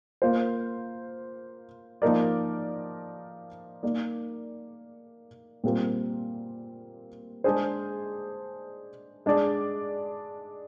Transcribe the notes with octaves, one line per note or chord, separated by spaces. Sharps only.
A#3 F4 C5
F3 A#3 D#4 A#4 D5
A#3 D#4 A#4 D5
A#2 G3 C4 F4 A#4
G#3 D4 G#4 C5
G#3 D4 G#4 D5